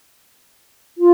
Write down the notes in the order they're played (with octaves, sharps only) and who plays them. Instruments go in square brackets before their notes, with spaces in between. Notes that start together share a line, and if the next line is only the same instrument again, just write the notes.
[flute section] F4